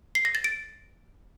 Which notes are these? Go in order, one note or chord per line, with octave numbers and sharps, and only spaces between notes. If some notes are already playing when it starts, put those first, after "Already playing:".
C7
A#6
A6
D7